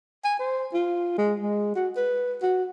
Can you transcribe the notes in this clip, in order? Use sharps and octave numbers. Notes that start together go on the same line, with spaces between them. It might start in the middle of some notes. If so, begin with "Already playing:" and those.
G#5
C5
F4
G#3
G#3
F#4
B4
F#4